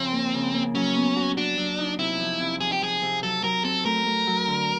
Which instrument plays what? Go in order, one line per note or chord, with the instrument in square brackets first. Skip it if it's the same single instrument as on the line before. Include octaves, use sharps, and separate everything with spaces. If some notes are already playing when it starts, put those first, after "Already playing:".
Already playing: [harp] C#3 F3 [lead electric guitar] C4
[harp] A#3
C#3
A#3
[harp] F#3 [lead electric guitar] C#4
[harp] B3
F#4
[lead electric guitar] D4 [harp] F#4
[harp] F#3
D#4
[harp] C3 [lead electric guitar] E4
[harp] F3
C3
[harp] F3 [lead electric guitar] G#4
[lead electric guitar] G4
[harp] F3 [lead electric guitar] G#4
[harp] C3
[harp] F#3 [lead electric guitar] A4
[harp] F#3 [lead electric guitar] A#4
[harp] C4 [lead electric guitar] A4
[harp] A3 [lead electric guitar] A#4
[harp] A3
F#3
D3